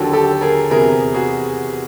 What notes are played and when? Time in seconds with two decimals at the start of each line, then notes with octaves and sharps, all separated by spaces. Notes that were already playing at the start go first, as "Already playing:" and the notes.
Already playing: D#2 D3 F#3 G4 A4
0.13 G4 A4
0.41 G#4 A#4
0.70 E2 C3 E3 G#4 A#4
1.14 F#4 G#4